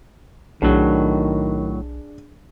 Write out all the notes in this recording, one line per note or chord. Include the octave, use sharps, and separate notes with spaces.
B1 A2 D#3 F#3 D4 G#4